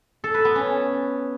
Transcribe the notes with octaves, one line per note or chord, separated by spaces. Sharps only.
A4
B4
B3
C#4